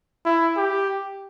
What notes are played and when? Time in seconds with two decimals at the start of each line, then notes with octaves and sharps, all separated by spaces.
0.25 E4
0.57 G4